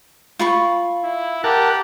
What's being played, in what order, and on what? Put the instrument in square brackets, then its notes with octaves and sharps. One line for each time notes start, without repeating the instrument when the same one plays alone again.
[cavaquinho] F4 B5 C#6
[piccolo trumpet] E4
[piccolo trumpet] G4 [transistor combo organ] A#4 F#5 A5